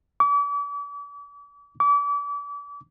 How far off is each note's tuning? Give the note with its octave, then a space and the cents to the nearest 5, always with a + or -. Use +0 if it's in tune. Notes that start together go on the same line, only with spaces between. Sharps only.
D6 -40
D6 -35